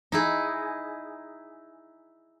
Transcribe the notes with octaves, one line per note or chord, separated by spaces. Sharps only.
D#4 E4 G#4